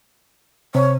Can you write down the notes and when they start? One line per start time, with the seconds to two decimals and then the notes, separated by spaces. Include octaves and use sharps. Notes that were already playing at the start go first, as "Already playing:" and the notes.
0.75 C3 C#5